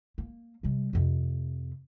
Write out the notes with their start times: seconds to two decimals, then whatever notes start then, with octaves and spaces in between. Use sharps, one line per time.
0.18 A#3
0.63 C3 G3
0.93 F2 C3